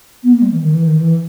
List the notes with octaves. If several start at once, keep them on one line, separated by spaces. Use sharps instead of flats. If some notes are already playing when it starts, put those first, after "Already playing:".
B3
A#3
G3
E3
D#3
E3
D#3
E3